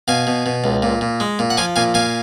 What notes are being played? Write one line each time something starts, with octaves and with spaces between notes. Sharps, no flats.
B2 F5 G#5
B2
B2
C#2
A#2
A#2
G#3
A#2
F#5
F3 F5 G#5
A#2 F5 G#5
A#2 F5 G#5